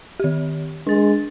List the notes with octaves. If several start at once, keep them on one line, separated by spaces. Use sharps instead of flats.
D#3 G4
G#3 D4 A6